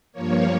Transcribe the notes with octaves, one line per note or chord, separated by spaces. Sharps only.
G2 F3 A#3 C#5